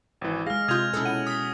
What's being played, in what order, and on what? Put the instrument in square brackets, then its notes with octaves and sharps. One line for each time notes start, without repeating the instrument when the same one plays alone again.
[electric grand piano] G#1 E3
[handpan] G#3 G#4 [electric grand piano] F5 [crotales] F6 A#6
[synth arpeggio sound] C3 F4 [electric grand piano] D#6 G6 [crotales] G#6 F7
[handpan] B2 C#4 [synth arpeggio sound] E4 G#4 A4
[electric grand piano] F#5 [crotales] D#7
[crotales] D#6 [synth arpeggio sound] B6